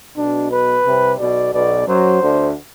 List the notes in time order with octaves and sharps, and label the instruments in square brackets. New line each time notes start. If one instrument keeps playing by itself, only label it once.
[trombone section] B1 B2 [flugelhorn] D4
[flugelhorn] B4
[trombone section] C2 C3
[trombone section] B1 B2 [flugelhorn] D5
[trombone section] B1 B2 [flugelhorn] D5
[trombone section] F#2 F#3 [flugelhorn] C5
[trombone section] D2 D3